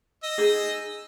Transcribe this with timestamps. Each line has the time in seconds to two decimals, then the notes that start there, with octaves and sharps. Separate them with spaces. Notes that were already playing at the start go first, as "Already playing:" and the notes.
0.23 D#5 E6
0.38 D#4 G#4